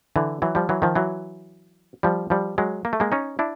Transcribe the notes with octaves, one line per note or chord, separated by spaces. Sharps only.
D3 E3
E3 F#3
F3 G3
E3 F#3
D#3 F3
E3 F#3
F3 G3
F3 G3
F#3 G#3
A#3
A3
G#3 A#3
C#4 D#4
D4 E4